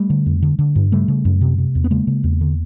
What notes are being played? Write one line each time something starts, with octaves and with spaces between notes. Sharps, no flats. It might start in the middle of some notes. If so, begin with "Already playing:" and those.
Already playing: G3 A3
D3
F2
D3
D3
G2
C#3 G3 A3
C#3
F#2
C3
C3
E2
B3
C#3 G#3 A#3
C#3
E2
D3